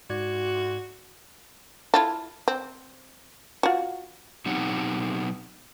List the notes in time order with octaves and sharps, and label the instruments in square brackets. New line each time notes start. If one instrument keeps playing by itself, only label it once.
[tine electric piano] G#2 D5 G#6 [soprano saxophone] F#4
[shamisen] E4 F4 A4
C4
F4 F#4
[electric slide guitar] B2 F#3 C4 D#4 G4 F#5